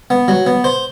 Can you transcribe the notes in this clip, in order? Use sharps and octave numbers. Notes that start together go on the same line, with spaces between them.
B3
F#3
B3
C5